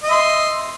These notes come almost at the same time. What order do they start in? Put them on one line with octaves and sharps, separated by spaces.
D#5 E5 C6